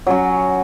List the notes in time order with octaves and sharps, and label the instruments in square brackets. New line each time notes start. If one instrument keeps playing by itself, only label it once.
[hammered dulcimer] F#3 C#4 F#4